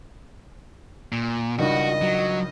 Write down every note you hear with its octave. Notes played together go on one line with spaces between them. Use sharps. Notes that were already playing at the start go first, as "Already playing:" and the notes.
A#2
C#2 G2 D#3 F#4 D#5
F#3